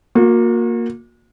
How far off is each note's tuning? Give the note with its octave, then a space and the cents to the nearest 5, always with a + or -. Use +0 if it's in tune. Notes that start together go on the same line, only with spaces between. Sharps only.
A#3 +0 F#4 -40